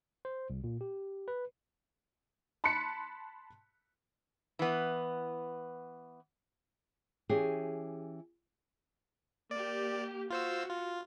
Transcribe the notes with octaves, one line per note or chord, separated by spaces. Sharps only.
C5
C2
A#2
G4
B4
A5 B5 C6 F#6 B6 C#7
E3 B3
E3 C#4 G4 G#4
A#3 G4 D5
F4 F#4 C5 E6
F4